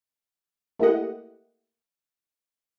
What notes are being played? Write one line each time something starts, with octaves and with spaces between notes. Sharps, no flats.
A3 A#3 E4 G4 D#5 F#5